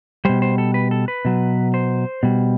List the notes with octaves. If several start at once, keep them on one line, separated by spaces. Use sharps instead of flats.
B2 G3 C5
C5
A4
B4
A4
B4
B2 F#3
C5
B2 G3